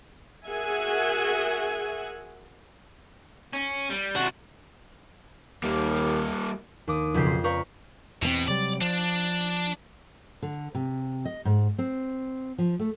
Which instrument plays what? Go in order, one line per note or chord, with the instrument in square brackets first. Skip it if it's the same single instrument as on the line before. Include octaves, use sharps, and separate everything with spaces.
[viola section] F#4 G#4 A#4 E5 F#5 G#5
[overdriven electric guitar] C#4
G3
[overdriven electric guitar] C3 D4 [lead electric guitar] F#4
[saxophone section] D#2 [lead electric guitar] G3 A#3
[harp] D#2 D6 D#6
B1 F2 C#3 G5 B6 C7
C6
B4 C5 D5 F5 A#5 C#6
[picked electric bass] E2 A3 C4 [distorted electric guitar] B2
[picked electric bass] C3 F#3 G3 [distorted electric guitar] D5
[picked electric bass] F3 [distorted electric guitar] D4
[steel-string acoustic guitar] D3
C3
D#5
G#2
C4
F3
A3